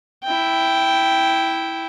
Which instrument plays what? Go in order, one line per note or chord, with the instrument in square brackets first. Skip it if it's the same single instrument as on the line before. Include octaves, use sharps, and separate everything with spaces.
[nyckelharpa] E4 G5